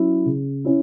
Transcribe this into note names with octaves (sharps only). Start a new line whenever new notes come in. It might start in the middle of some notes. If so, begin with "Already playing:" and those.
Already playing: F#3 C#4 E4
C#3
C#4 E4